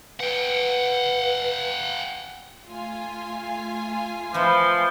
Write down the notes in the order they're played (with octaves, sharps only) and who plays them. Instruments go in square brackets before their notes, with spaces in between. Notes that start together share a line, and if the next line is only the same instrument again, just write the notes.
[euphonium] B4 [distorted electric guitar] F#5 G5
[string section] A3 F4 G#5
[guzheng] E3 E4 [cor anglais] F3